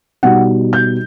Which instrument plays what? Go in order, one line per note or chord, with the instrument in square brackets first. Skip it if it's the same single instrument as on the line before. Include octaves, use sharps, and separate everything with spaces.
[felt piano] B2 G3 D#4 F#5
G6